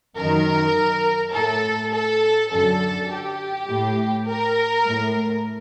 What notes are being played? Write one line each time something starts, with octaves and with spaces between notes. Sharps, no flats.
F#2 D#3 A#4
A2 A4
A4
F#2 D3 A4
G4
A2
A#4
A2